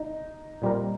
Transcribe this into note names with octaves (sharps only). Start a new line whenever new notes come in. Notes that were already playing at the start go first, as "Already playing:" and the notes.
Already playing: D#4
A#2 G3 C4 G4 A#4